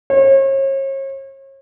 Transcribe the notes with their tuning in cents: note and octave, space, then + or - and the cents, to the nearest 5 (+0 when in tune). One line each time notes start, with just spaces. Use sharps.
C#5 -40